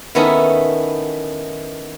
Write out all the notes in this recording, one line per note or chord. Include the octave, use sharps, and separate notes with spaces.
D#3 B3 C#4 E4 A4 A#5